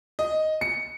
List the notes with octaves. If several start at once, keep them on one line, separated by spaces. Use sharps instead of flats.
D#5
C#7